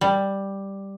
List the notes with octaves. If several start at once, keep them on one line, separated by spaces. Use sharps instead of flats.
G3